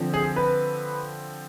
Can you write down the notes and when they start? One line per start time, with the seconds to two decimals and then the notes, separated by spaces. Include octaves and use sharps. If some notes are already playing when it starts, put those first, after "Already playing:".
Already playing: D3 F3 C4
0.14 G#4
0.36 B4